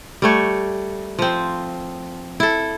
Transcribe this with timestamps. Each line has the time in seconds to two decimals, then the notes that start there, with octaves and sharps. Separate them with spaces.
0.22 G3 A3 C#5
1.19 F3 C4
2.40 E4 A4